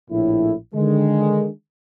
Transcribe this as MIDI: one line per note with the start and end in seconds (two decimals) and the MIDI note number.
0.10 0.53 34
0.10 0.53 45
0.10 0.53 64
0.75 1.48 50
0.75 1.48 51
0.75 1.48 56